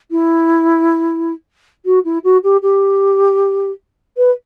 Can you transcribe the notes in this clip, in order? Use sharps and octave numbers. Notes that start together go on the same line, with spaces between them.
E4
F#4
E4
F#4
G4
G4
B4